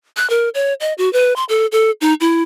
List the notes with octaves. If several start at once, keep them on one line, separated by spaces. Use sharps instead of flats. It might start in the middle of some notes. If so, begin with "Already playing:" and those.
F#6
A#4
C#5
D#5
F#4
B4
C6
A4
A4
D#4
E4